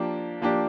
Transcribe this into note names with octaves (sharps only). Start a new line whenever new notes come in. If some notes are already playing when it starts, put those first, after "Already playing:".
Already playing: F3 A#3 D4 G4
F3 A#3 D4 G4